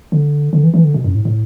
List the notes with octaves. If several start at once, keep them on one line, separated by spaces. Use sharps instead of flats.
D3
D3
E3
E3
D3
B2
F#2
A2
A2